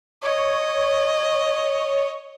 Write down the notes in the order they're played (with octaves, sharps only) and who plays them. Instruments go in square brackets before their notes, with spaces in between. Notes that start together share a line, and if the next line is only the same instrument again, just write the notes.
[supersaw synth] C#5 [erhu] D#5